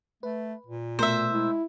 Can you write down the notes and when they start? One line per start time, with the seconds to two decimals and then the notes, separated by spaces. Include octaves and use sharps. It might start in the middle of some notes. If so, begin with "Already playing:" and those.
0.23 A3 B4
0.67 A#2
0.99 B2 A3 A#4 C5 E5
1.32 G#3 E4